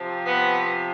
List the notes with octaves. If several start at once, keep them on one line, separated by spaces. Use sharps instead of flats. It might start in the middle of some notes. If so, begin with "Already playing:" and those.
Already playing: C3 F3
B3